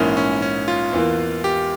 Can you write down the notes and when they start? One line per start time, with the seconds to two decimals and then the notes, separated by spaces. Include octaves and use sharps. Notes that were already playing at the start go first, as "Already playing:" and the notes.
Already playing: A#1 G#2 E3 A#3 C#4
0.17 C#4
0.42 C#4
0.68 F4
0.93 E2 E3 A#3
1.44 G4